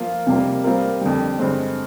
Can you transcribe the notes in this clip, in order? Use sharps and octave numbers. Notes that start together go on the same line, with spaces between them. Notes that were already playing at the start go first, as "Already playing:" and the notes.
Already playing: F3 A#3 F4 A#4
F2 C3 G3 A#3 F4
G3 C4 F4 A#4
F2 D3 G3
G2 D3 G#3 C4